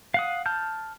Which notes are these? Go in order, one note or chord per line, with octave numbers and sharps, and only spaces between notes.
F5 F#5 D#6
A5 F6 G6